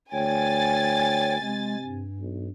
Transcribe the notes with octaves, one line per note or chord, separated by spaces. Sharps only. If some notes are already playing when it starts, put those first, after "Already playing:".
D2 C#5 G5 G#5 A6
C3 G#3
G2
B1